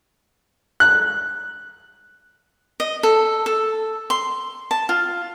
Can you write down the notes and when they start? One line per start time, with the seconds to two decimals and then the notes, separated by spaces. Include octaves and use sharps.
0.80 F#6
2.80 D#5
3.03 A4
3.46 A4
4.10 C6
4.71 A5
4.89 F4